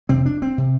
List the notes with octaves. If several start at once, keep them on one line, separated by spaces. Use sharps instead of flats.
F2 C3 C4
D4
C4
C3